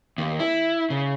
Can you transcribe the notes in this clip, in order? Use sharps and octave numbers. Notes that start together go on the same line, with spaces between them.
D#2
E4
C#3